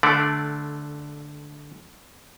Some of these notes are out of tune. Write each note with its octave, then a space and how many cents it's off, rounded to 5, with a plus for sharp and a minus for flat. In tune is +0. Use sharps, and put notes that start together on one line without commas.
D3 +0 A3 -15 D5 +0